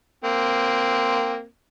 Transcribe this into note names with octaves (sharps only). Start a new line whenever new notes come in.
A#3 C4